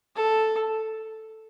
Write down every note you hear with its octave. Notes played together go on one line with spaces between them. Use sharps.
A4